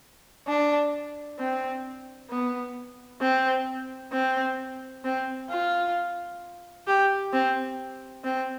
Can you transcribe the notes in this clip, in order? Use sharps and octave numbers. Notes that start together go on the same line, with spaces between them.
D4
C4
B3
C4
C4
C4
F4
G4
C4
C4